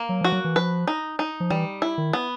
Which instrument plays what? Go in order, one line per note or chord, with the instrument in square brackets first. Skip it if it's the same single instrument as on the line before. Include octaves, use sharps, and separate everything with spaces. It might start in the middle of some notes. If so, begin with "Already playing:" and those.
Already playing: [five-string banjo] A#3
[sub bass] F#3
[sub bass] F3 [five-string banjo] F#4
[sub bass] F#3
E3
[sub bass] F3 [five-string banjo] B4
[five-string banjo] D#4
D#4
[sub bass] F3
[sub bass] E3 [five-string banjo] G3
[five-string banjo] E4
[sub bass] D#3
[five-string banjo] B3